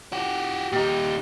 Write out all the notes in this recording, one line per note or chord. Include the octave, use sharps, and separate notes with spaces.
F#4 G4
A#2 D#4 G4